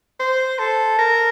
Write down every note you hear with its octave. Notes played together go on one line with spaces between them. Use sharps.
C5
A4
A#4